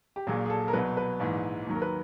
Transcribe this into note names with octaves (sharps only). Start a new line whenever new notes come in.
G4
A#1 A#2 F#3 G#4
G#4
A4
A#4
C2 B2 F#3 B4
B4
A#1 G#2 E3
D#2 D#3 F#3
A#4
B4